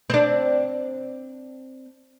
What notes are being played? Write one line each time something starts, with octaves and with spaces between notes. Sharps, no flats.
C4 D4